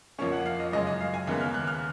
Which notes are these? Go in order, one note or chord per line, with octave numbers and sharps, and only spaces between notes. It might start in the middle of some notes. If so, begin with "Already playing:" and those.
F2 F3 A#3 C#4 C#6
F#5
F5
D#5
F#2 C#3 G#3 D#5
D#5
F5
G#5
D#2 C#3 G#3 B3
F6
F#6
F6